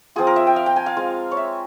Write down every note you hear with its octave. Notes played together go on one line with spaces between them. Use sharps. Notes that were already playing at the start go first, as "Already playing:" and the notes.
F3 C4 F4 G#4
A#4
E5
G5
F5
G5
G#5
F5
G#3 C4 F4
C#5
E5